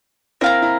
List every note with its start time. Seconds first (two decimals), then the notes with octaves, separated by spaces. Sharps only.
0.41 C4 E4 A#4 F5 A#5
0.62 E4